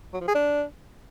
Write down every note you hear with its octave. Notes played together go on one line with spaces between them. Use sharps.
F#3
F3
G#4
D4